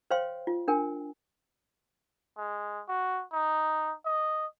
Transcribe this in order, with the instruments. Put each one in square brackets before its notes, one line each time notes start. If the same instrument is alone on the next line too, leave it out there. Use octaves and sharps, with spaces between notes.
[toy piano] C5 C#5 F5 G5 C6
F4
D4 A#4 G5 G#5
[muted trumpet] G#3
F#4
D#4
D#5